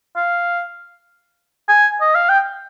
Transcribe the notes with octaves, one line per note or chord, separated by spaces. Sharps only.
F5
G#5
D#5
F5
G5